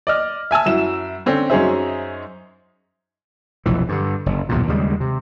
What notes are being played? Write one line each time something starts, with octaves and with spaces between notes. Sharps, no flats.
D5 D#5 F6
E5 G#5 A5 E6
F#2 E4 E7
D3 C4 C#4
F#2 C#4 D#4 G#4 C5 E5
F1 B1 F2 E3
G2 D3
F#1
B1 E2 G2 A#2
D#2 C#3 G3 G#3
C3